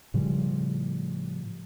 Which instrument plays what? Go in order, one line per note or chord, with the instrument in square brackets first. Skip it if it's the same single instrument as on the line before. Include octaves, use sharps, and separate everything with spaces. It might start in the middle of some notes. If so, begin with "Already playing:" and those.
[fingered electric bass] A2 C#3 F3 G3